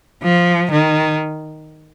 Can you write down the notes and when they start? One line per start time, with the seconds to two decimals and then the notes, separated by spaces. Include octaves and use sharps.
0.23 F3
0.72 D#3